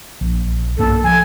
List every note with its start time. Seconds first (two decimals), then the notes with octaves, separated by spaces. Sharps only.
0.21 A#1
0.78 B1 G2 A#3 A4
1.04 F3 G#5